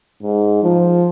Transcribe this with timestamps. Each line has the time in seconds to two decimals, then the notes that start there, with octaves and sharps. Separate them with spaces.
0.23 G#2
0.63 F3